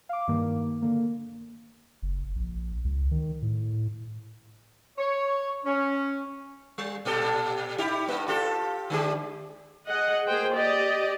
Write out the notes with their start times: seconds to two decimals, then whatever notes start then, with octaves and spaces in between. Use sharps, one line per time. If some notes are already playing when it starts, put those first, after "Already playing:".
0.09 F5 D6
0.28 G2 D#3 A#3
0.82 D3 A#3
2.02 F#1
2.36 A#1
2.85 C#2
3.11 D#3
3.42 A2
4.98 C#5
5.65 C#4
6.78 G3
7.05 A#2 G4 A4
7.78 D#4 E4 G4
8.07 G2 A#3
8.28 F4 G4 A4
8.90 D3 G#3 G4
9.87 G#4 D#5 F#5
10.28 A#3 G#4 C5 G5
10.57 G4 D5 D#5